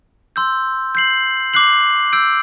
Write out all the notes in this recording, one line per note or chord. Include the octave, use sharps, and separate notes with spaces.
C6 E6 G6
G6 C7 F#7
D6 F#6 C7 F#7
E6 G6 D7